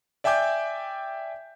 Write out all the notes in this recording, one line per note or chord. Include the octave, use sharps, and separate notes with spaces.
D5 E5 G5 G#5 D6 G6